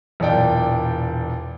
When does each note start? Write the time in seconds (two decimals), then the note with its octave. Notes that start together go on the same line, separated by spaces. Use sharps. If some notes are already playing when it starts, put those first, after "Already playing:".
0.20 E1 A#2 D5 G5